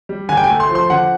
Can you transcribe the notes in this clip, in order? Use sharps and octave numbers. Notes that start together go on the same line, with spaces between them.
G3
D3 G#5
G5
G#5
A3
C6
F3
C6
D3 F#5